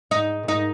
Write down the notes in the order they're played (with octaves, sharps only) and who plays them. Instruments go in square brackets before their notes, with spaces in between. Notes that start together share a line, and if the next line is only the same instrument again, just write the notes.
[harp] G#2 [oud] D#4
[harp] A#2
[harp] G#2 [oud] D#4